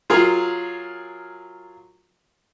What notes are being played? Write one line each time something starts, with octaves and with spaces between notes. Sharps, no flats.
F#3 F4 G#4 A#4